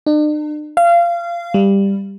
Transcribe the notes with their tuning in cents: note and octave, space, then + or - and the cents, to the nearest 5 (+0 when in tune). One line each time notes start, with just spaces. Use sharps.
D4 +45
F5 -25
G3 +10